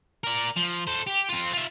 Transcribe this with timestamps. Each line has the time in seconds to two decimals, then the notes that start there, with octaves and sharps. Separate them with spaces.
0.24 A#4 D5
0.57 F3
0.87 A4 C5
1.07 G4
1.29 C4 F4
1.53 F4 E5